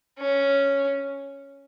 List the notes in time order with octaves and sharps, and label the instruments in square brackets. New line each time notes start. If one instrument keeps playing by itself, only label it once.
[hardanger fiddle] C#4